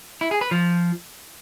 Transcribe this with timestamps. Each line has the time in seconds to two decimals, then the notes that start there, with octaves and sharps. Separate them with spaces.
0.21 E4
0.31 G#4
0.41 B4
0.51 F3